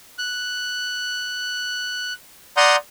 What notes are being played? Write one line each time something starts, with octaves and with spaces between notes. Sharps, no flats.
F#6
D5 F#5 A#5 C6 D#6 G6